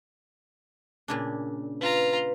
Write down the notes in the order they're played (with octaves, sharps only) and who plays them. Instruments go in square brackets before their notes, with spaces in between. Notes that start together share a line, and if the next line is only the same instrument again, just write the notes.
[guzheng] A#2 C#3 D4
[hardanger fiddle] F4 A#5 [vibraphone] B4